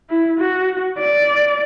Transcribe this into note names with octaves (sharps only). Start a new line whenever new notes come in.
E4
F#4
D5